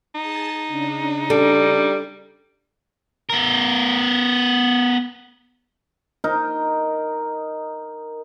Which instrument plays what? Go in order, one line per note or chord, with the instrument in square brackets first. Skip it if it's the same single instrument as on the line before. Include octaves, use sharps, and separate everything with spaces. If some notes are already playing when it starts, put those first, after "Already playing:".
[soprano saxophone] D#4 [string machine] G#4 A5
[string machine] C#3 D4
[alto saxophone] G3 [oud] A4
[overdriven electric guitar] B3 A#4
[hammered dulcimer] D#4 A#4